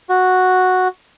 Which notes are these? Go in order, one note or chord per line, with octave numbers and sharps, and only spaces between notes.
F#4